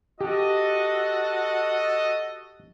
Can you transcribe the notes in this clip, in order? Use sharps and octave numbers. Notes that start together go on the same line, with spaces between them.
F#4 G4 A4 D#5